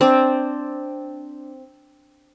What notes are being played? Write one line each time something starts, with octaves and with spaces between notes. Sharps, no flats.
C4 D4